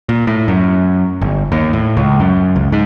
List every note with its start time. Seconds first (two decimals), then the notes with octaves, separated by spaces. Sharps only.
0.09 A#2
0.27 A2
0.48 F#2
1.21 G1
1.52 D#2
1.73 A2
1.97 C#2
2.20 F#2
2.56 C#2
2.72 G#2